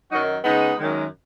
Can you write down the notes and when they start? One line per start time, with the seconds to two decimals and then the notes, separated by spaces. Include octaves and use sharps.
0.11 F#2 D#3 F#3 D#4 F#4
0.44 C#3 G#3 B3 D#4
0.78 F#2 D#3 G#3